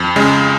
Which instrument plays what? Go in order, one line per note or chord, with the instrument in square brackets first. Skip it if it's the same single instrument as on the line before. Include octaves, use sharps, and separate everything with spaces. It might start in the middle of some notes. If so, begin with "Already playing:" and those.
Already playing: [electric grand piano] F2
C#3 G#3